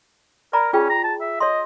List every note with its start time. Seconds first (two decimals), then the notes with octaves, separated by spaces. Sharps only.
0.53 A#4 D5 A#5 B5
0.73 C#4 F4 G#4 G5
0.90 A#5
1.04 A5
1.21 E5
1.40 C#5 D#5 C6